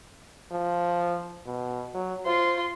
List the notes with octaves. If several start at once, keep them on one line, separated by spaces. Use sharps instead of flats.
F3
B2
F#3
F4 C5 C6